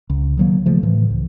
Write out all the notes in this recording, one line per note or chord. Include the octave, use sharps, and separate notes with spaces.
C#2
D#3 F#3 A#3
C#3 F3 A3
A2 E3
C#2